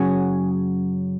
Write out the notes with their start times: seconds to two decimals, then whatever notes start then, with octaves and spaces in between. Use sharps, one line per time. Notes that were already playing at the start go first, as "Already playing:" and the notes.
Already playing: F#2 C#3 F#3 G#4